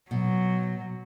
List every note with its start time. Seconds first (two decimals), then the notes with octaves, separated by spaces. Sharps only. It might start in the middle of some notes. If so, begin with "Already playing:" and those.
0.11 B2 F#3